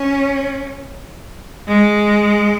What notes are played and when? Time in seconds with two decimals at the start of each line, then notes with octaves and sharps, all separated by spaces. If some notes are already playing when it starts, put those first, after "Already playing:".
Already playing: C#4
1.68 G#3